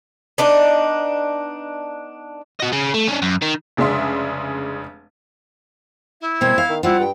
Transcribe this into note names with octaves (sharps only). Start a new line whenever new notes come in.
B3 D4 D#4
F#4 D#5
C#3
A3
C#4 D4
F#2
D#3
F1 C#3 G#3 D4 E5 C6
E4
B2 G3 A#3 C4 G#6
F5
D#3
G3 C4 E4 F4 F#5
G2 G5